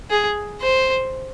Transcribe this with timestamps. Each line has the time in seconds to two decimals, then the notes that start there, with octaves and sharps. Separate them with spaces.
0.10 G#4
0.61 C5